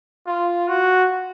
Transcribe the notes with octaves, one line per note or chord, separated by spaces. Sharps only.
F4
F#4